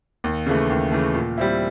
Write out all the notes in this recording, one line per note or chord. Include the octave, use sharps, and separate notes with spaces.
D#2
C#3 E3 A3
D#2
C#3 E3 A3
A#2
G3 C4 E4